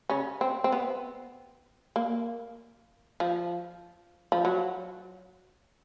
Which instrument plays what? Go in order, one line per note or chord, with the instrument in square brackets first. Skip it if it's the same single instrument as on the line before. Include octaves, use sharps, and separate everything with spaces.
[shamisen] C#3 C#4
C4
C4
B3
A#3
F3
F3
F#3